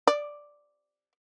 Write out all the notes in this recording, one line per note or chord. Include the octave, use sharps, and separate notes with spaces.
D5